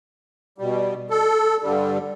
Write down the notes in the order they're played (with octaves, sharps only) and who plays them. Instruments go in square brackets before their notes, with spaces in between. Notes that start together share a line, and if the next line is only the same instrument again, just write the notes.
[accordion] B2 G3
A4
G2 D3 G3